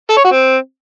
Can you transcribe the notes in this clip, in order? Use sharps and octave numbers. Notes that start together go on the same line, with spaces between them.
A4
C#5
F#4
C4